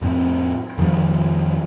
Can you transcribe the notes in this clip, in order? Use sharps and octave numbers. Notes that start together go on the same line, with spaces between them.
F2 A2 C4
F2 D#3 F3 G3